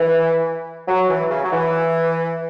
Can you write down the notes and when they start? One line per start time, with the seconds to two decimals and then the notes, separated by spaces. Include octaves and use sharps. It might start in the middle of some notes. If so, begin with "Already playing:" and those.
Already playing: E3
0.88 F#3
1.09 E3
1.31 C#3
1.44 F#3
1.52 E3